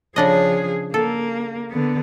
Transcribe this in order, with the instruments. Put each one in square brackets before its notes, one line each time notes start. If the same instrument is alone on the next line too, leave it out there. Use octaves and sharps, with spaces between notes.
[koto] C#3 D4 D#5 [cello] F3 G#4
[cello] A#3 [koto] A4
[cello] D3 B3